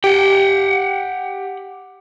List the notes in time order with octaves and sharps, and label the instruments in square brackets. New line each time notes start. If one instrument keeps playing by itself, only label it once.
[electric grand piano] G4 [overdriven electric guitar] F#5 G5